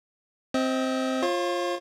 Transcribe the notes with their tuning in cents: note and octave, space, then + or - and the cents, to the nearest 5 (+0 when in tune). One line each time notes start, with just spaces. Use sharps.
C4 +0 D#5 +35
F4 +0 C#5 -45